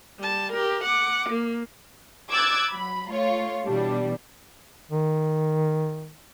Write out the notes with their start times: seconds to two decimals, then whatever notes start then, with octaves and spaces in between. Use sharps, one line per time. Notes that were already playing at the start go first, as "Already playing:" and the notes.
0.19 G3 A5
0.52 G4 A#4
0.84 F#5 D6
1.29 A#3
2.31 D6 E6 F#6 G#6 A6
2.69 F#3 B5
3.10 A3 F4 C#5
3.65 B2 E3 G3 D4
4.91 D#3